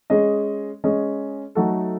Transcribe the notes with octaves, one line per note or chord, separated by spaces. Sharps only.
G#3 C#4 G#4 D#5
G#3 C#4 G#4 D#5
F#3 A3 D#4 F#4 A4